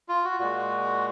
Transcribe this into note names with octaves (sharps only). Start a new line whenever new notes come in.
F4
F#4
A#2 G#3 F#4